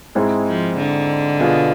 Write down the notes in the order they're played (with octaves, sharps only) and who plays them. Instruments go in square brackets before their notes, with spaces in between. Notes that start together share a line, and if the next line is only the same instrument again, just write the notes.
[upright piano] G#2 G#3 C4 E4 G#4
[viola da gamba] F3
D3
[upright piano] B2 B3 F4 G#4